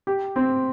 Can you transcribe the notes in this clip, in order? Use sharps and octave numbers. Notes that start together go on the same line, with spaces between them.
G4
C4